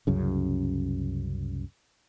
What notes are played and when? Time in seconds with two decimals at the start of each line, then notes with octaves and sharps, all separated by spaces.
0.07 C2 F#2 C#3